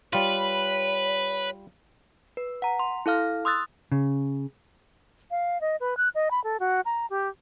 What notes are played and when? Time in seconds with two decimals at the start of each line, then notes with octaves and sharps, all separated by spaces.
0.13 G3 F4 B4 C#5
2.37 B4
2.62 F#5 A#5
2.79 C6
3.06 E4 A4 F5 F6
3.45 C6 D#6 E6 F#6 A6
3.92 C#3
5.31 F5
5.61 D#5
5.80 B4
5.97 F#6
6.15 D#5
6.31 B5
6.44 A4
6.60 F#4
6.85 A#5
7.10 G4